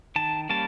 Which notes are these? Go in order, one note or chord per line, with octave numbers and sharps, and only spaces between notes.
D#3 A5
G3 A#3 C#4 A5